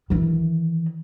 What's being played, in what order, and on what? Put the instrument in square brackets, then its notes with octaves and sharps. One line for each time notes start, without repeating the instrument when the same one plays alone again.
[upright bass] D#3 E3